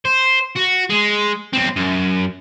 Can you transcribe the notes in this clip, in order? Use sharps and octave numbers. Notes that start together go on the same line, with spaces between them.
C5
F#4
G#3
B1 C4
F#2